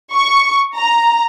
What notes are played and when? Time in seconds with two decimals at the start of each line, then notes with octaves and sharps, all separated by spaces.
0.14 C#6
0.77 A#5